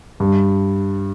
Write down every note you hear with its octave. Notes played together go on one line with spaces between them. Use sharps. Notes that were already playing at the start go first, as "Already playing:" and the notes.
G2